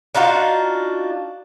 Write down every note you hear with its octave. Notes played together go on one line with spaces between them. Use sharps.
D4 D#4 F4 F#4